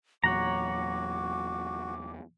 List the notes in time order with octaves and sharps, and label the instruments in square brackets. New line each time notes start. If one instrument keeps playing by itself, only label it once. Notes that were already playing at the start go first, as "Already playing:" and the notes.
[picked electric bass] E2 A#2 F#3 [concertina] F#4 [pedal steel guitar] C#5 F#5 A#5 [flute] D6